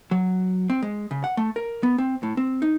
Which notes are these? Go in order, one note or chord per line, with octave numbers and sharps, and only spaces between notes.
F#3
C4
G#3
C#3
F#5
A3
A#4
B3
C4
A2
C4
D#4